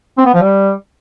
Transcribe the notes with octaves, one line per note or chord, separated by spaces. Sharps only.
C4
B3
F3
G3